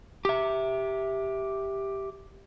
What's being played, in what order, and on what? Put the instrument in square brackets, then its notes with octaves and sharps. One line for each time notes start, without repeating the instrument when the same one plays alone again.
[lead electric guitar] G4 E5